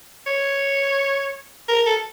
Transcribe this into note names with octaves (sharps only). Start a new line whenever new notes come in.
C#5
A#4
A4